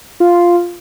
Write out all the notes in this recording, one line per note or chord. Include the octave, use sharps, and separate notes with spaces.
F4